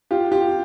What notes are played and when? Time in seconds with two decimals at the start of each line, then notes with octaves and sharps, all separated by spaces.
0.11 F4 G4
0.32 F4 G4